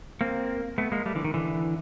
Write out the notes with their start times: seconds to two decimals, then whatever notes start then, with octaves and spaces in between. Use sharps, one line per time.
0.21 A#3 C4
0.78 A3 B3
0.92 G#3 A#3
1.06 G3 A3
1.15 D3 E3
1.24 D#3
1.34 D3 E3